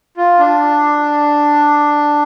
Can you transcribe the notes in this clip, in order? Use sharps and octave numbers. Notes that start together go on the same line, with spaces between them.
F4
D4